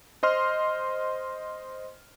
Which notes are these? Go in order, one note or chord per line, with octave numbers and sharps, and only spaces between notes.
C5 D#5 C6 F6